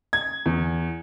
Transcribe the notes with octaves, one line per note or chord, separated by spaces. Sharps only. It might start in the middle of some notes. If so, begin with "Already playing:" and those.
G#6
E2